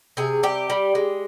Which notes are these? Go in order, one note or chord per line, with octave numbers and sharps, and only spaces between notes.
C3 G#4
G3 G4
G3
G#3